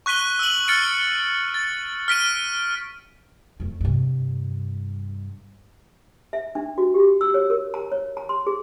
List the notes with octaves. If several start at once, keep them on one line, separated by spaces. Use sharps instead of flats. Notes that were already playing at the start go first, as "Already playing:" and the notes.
C#6 F#6 B6 D#7 G7
E6 F#7
F6 A6 C#7 D7
A6
F6 B6 D7 D#7
F2 A3
G2 C3
E5
D4
F#4
G4
E6
C#5
A#4
A#5
C#5
A#5
C6
G#4